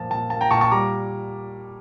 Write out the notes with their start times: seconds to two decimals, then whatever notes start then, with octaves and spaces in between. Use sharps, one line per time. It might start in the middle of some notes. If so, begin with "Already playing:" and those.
Already playing: A#2 F3 A#3 A5
0.10 A#2 A5
0.30 A#3 A5
0.41 G5 A#5
0.51 A#2 A5 C#6
0.61 A5 C#6
0.71 G3 A#5 D6